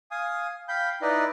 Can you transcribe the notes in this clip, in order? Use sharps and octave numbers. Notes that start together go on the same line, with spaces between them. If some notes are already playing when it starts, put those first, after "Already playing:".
F5 G#5 D#6
F5 G5 B5 G6
D#4 E4 B4 D5 D#5